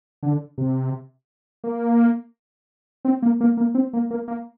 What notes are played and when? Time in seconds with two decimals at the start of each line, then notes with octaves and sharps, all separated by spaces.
0.23 D3
0.58 C3
1.64 A#3
3.05 C4
3.22 A#3
3.41 A#3
3.57 A#3
3.75 C4
3.93 A#3
4.11 A#3
4.28 A#3